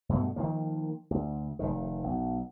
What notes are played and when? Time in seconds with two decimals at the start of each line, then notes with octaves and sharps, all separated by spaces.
0.09 G2 B2 A3
0.36 D#3 F3 A#3
1.11 D2
1.59 F1 C2 D#3
2.04 B1